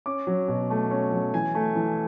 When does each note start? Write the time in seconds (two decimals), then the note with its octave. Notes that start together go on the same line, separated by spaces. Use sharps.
0.06 C#4 D6
0.27 F#3
0.48 B2
0.70 A3
0.91 C#4
1.12 F#3
1.34 E3 G#5
1.55 A3
1.75 E3